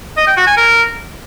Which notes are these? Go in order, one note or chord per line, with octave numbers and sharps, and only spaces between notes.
D#5
G5
F#4
G#5
A#4